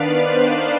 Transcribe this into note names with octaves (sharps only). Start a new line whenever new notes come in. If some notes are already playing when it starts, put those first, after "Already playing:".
Already playing: D#3 B3 D4 B4 D5 F5
C5